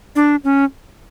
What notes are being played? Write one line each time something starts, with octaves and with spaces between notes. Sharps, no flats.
D4
C#4